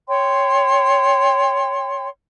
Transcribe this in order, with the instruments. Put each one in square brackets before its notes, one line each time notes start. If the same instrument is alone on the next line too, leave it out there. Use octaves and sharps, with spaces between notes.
[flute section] C#5 G5 C6